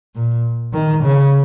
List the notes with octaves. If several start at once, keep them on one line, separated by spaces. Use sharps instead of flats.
A#2
D#3
C#3